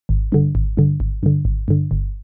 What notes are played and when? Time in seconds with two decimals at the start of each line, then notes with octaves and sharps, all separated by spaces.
0.09 G#1
0.32 G2 D3
0.55 G#1
0.77 G2 D3
1.00 G#1
1.23 G2 D3
1.45 G#1
1.68 G2 D3
1.91 G1